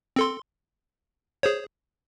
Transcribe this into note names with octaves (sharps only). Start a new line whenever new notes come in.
C4 A4 C6
G#4 C5 C#5